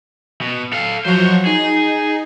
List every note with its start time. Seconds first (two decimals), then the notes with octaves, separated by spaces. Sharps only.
0.41 B2
0.73 A4 F5
1.05 F3 F#3 F#4 C5 C#5
1.46 D#4 G#4